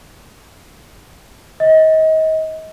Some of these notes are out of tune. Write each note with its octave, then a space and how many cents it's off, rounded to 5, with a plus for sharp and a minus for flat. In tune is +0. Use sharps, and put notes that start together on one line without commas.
D#5 +30